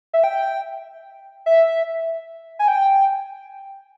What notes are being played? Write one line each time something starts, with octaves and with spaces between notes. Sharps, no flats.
E5
G5
E5
G#5
G5